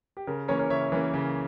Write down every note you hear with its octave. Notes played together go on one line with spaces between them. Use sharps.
G4
C#3 A#4
E3 A#3 C#4 A#4 C#5
A#4 C#5
C#3 C#5 E5
E3 A#3 C#4
C#3